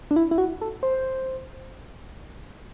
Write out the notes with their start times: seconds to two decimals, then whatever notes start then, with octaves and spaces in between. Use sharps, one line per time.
0.11 D4
0.16 E4
0.31 E4
0.38 F#4
0.61 A4
0.83 C5